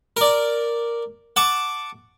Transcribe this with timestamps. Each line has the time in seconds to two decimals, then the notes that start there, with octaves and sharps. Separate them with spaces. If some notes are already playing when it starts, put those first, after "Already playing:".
0.17 A#4 D5
1.36 F#5 A5 C#6 D6